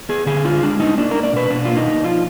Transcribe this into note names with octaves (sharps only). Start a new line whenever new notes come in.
B3 G#4
D3 G#4
D4 F4
G#3 D4
B3 D#4
A#3 D4
D4 A#4
D5
B2 B4
B2 D4
A#3 F4
D#4
D4
F3 F4